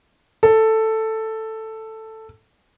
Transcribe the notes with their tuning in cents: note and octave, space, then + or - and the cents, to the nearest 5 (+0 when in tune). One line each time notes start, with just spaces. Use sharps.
A4 +5